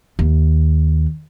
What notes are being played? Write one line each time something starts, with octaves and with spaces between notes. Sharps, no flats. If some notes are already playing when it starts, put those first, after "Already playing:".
D#2